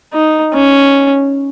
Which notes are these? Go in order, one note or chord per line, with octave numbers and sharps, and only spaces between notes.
D#4
C#4